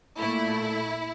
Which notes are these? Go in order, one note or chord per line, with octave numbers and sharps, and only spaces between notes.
A#2 A3 E4